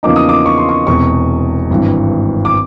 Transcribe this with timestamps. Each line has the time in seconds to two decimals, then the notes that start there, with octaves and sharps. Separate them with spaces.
0.03 E2 C#3 F3 A#3 D#4 D6
0.16 D#6
0.29 D6
0.46 C#6
0.58 C6
0.69 C#6
0.87 E1 E2 C3 C#6
1.70 G#1 G2 E3
2.45 D6